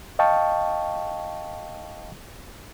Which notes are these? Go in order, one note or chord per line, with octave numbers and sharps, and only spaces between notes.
D#5 F5 G5 A5 C#6